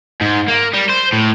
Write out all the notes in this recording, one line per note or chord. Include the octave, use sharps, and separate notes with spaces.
G#2
A#3
G3
C5
A2